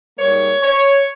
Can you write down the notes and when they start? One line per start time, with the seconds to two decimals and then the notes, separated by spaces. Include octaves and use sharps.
0.18 G#2 G3 A#3 C#5
0.63 C#5